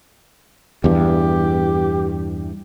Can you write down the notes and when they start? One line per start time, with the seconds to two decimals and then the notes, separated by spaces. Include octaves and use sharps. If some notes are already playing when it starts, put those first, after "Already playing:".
0.84 E2 G2 G4